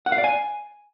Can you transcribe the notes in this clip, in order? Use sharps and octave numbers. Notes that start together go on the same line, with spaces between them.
F#5
F5
D5
G#5